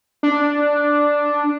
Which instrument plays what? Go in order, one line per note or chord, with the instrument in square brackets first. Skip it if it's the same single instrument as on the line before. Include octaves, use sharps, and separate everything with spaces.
[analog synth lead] D4